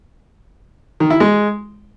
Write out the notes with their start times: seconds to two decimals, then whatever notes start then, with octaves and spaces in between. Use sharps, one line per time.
1.00 D#3
1.10 E4
1.20 G#3